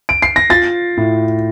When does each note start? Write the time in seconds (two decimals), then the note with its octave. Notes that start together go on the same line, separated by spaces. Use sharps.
0.09 D7
0.22 C7
0.36 A#6
0.50 F4 A6
0.97 A2